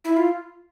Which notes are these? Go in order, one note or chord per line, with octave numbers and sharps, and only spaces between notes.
E4
F4